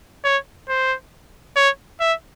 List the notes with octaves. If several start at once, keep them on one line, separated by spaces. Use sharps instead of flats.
C#5
C5
C#5
E5